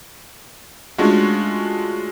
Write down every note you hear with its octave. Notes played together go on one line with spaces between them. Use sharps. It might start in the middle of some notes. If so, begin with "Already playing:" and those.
G#3 A3 C#4 D4 F4 F#4